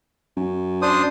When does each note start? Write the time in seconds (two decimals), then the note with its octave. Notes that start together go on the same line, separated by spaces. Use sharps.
0.36 F#2
0.82 D4 C5 D#6